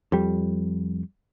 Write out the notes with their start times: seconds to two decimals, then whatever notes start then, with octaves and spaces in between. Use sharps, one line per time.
0.12 F2 G3